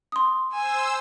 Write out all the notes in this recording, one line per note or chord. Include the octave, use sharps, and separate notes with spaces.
C6 D#6
C5 G#5 E6